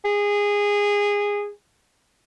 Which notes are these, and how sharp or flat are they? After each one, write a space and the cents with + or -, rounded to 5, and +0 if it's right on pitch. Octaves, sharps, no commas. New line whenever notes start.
G#4 -20